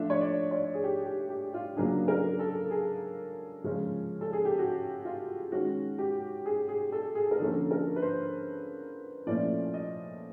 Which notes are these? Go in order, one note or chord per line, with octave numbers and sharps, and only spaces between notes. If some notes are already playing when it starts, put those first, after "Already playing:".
Already playing: F3 A3 D4 E5
C#5
D5
C#5
G#4
G4
G4
G4
F4
C#3 F#3 A#3 D4 G#4
A#4
A4
G#4
C#3 F3 G#3 C#4
A4
G#4
G4
F#4
F4
D#3 G#3 C#4 F#4
G4
G#4
G#4
A4
G#4
A#4
D3 F3 A#3 C#4 A4
A#4
B4
C5
A#2 F3 A3 C#4 E4 D5
D#5